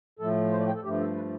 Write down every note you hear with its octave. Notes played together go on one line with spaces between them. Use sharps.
A2 F3 A3 A4
C5
D5
G5
A4
G2 F3 A3 G4
A4
B4